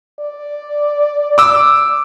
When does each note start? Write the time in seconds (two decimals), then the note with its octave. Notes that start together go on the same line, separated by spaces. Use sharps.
0.20 D5
1.38 D6 E6